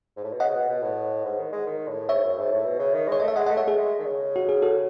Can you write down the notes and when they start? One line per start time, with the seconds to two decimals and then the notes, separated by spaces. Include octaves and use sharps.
0.17 G#2
0.24 A2
0.33 B2
0.40 C#3 D#5 F#5
0.55 B2
0.69 B2
0.82 A2
1.25 G#2
1.38 D#3
1.53 G#3
1.67 D#3
1.88 A2
2.09 G#2 C#5 E5
2.23 F#2
2.38 G#2
2.52 A2
2.65 B2
2.79 C#3
2.94 D#3
3.08 G#3 C#5
3.20 A3 D#5
3.28 E5
3.36 G#3 D#5 F#5
3.46 D#5 F#5
3.50 A3
3.57 C#5 E5
3.64 A3 G#4
3.78 G#3
3.99 D#3
4.05 C#3
4.36 F#4
4.49 G#4
4.62 F#4 A4